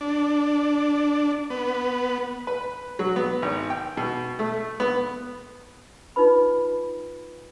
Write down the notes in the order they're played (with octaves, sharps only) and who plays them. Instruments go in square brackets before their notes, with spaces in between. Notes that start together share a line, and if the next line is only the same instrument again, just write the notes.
[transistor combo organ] D4
B3
[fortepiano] B4
F#3
B3
G#1
G5
B2
A3
B3
[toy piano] D#4 F4 B4 B5